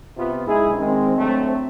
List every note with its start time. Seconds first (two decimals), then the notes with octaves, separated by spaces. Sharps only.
0.17 C3 B3 F4
0.47 G#3 D#4 E4 G#4
0.79 D#3 G#3 C4
1.17 D2 F#3 A3